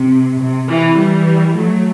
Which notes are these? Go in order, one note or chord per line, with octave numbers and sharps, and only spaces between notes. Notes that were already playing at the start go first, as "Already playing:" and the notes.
Already playing: C3
C3
C3 E3
E3 G3
F#3 A3